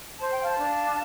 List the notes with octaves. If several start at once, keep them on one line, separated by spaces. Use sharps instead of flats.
C5 A5
G5
F5 A5
D4